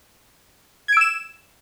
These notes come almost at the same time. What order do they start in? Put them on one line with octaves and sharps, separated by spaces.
G#6 D7 E6 E7